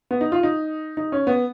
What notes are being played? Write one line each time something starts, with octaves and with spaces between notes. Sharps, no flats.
B3
D#4
F4
D#4
D#4
C#4
B3